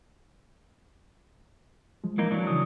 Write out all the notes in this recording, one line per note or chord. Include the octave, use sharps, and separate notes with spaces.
F3 G#3
E3 A#3 D#4
E3 F#3 D4
C#3 D#6